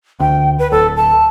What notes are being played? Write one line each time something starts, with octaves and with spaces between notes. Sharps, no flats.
D2 G5
B4
D1 A4
A5